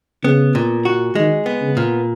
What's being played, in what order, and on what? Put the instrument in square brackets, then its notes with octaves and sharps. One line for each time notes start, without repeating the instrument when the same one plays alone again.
[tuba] C#3 [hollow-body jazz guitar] B3
[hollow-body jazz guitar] A#2
F#4
[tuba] D#3 [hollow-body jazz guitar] G#3
[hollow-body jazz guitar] B3
[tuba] C#3
[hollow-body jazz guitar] A#2